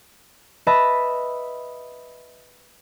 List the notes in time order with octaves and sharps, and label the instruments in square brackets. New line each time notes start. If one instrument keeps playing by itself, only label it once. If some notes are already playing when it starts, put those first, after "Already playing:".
[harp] B4 D#5 E5 A5 B5